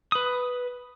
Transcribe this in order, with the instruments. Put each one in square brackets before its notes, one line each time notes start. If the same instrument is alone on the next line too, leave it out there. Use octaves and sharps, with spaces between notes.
[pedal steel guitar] B4 D#6